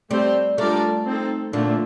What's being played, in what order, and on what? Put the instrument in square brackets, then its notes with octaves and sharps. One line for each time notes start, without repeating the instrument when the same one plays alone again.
[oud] G3 [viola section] A3 C4 G4 C5
[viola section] G3 D4 F4 A#4 D5 [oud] A3
[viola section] C4 D#4 A4
[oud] A#2 [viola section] D3 F3 A3